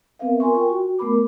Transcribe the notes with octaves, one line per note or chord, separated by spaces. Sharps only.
B3 C4 A#4 B4 E5 F5
F4 A#4 G#5 C6 C#6
G5 C#6
F#4
A3 B3 A#4 B5 D6